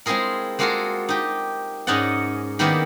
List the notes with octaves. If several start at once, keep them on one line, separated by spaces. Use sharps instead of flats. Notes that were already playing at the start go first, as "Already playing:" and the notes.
G#3 C4 E4 F4 G#4 A#4
G#3 A#3 F4 F#4 G#4 A4
D#4 G4
G#2 C#4 D#4 C#5 D5 F#5
D#3 A#3 B3 E4 G4 D5